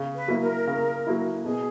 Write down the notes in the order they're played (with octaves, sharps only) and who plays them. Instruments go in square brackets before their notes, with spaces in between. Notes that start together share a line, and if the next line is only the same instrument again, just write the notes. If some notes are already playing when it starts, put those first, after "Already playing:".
Already playing: [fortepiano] C#3
[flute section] B4
[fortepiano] F#3 A#3 E4
[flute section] A#4
[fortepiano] C#3
F#3 A#3 E4
[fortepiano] B2 [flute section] G#4